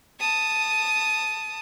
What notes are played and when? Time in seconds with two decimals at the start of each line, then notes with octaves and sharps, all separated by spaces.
0.20 A5 D#6